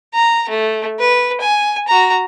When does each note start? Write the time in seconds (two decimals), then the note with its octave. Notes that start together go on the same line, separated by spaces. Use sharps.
0.14 A#5
0.49 A3
1.00 B4
1.41 G#5
1.88 F#4 A#5